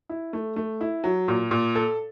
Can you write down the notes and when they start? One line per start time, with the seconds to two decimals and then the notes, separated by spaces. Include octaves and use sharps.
0.09 E4
0.33 A3
0.56 A3
0.81 E4
1.04 F#3
1.28 A#2
1.51 A#2
1.76 A4